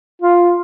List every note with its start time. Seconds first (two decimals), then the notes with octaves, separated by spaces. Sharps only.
0.22 F4